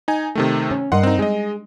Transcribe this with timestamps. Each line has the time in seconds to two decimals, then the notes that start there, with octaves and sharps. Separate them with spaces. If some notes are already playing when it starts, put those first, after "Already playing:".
0.08 D#4 G#5
0.35 C3 D#3 A3
0.71 C#4
0.92 G2 A#4 D#5 F#5 C6
1.03 C4 D#4
1.19 G#3 G#4 D#5